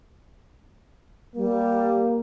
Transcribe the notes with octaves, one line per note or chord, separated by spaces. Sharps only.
G3 A#3